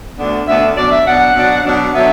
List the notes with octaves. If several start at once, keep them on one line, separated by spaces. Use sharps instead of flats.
D2 D3 B3 D4
D2 D3 B3 D4 E5
B2 F#3 D4 D5
E5
B2 F#3 D4 F#5
B2 F#3 D4
B2 F#3 D4
D3 F#3 B3 D4 E5